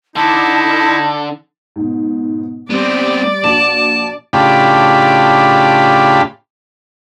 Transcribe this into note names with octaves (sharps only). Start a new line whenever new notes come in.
D3 D#4 E4 A5
G#2 B2
G3 B3 C4 D5
A#1 F#4 A5 F#7
A2 C#3 D4 F4 G4 B5